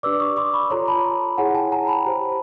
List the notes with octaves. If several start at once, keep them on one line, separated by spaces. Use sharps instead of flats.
D4 G4 B4 D5 D6 E6
C#6 D#6
C6 D6
B5 C#6
F4 A4 C#5 A#5 C6
A5 B5
E4 G#4 C#5 F#5 G#5
G5 A5
G#5 A#5
A5 B5
G4 C5